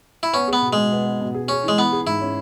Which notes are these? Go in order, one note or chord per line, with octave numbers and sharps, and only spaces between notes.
E4
B3 C#4
G#4
B3
B2
B2 G#3
B3
B3
B2
G#4
C#4 G#4
E3 G#3
E3 B3
G#4
G#2 E4
C#4